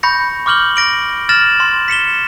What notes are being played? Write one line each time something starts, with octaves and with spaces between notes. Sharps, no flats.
B5 C#6 G6 A#6 C#7
C#6 D6 F6 G6 F#7 G7
A#6 D7 F#7
F6 A6 A#6 E7 F#7
C6
B6 C#7 E7 G7